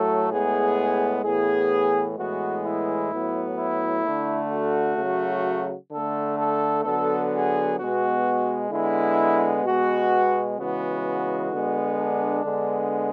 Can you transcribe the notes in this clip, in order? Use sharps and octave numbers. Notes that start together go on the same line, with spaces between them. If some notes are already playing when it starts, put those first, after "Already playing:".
Already playing: A2 F#3 A3 A4
A2 G#3 B3 G#4
A2 E3 B3 G#4
A2 E3 G#3 B3 F#4
E4
A2 F#3 B3
E4
D3 A3
F#4
C#3 F#3 A3
D3 A3 A4
A4
D3 F#3 B3 A4
G#4
B2 G#3 B3 F#4
D3 G#3 B3 E4
B2 G#3 B3 F#4
C#3 E3 G#3 B3 F#4
D3 G#3 B3
D4
D3 G#3 B3